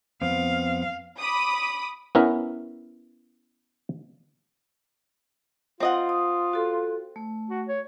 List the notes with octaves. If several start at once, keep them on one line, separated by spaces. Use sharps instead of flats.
F2 B3 C4 F5
B5 D6 D#6
B3 C#4 E4 A#4 B4
C4 F4 D#5 F#5
D#6
F#4 A4
A3
F#4
C#5